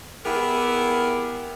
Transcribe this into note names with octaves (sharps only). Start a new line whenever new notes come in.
B3 E4 G4 G#4 A#4